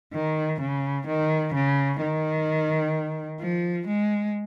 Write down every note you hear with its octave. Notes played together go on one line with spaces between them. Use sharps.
D#3
C#3
D#3
C#3
D#3
F3
G#3